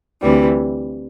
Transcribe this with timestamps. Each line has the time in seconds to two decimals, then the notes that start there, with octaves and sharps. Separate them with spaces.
0.22 D2 C3 E3 G3